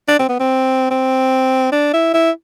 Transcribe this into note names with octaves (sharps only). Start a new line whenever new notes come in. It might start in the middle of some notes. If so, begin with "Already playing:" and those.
D4
C4
B3
C4
C4
D4
E4
E4